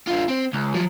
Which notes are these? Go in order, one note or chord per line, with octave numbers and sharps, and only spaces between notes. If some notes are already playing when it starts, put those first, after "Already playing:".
D3 F4
C4
C#2
F3 F#3